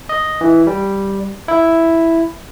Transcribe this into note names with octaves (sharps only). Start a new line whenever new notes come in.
D#5
E3
G3
E4